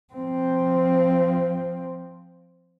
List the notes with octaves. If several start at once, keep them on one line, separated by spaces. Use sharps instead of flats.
F3 C4